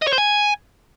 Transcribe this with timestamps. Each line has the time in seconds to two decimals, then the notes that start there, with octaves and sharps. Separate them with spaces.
0.02 D#5
0.07 C#5
0.13 C5
0.18 G#5